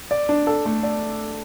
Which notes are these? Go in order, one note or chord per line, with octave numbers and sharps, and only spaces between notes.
D5
D4
A4
A3
D5